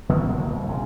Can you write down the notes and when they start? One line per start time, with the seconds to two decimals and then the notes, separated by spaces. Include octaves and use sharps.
0.09 D#3 B3 C#4
0.26 G1 F3 F#3
0.38 D1 A#3
0.50 C2
0.68 E1 C#3 G#3